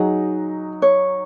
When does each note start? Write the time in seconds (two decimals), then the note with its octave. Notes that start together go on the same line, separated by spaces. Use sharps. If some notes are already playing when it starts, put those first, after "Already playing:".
Already playing: F#3 D#4 F#4 G#4
0.82 C#5